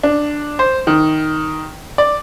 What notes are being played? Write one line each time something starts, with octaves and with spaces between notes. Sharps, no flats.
D4
C5
D#3
D5